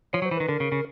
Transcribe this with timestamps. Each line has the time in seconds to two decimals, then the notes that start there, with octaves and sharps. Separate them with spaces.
0.13 F3 C#5
0.22 F#3
0.26 C5
0.31 E3
0.37 D#3 B4
0.48 D3 A#4
0.60 C#3
0.72 C#3